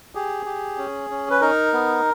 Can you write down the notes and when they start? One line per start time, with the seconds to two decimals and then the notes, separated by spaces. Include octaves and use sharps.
0.15 G4 G#4
0.46 G4
0.78 C#4
1.10 C#4
1.30 B4
1.41 D#4 A#4
1.73 B3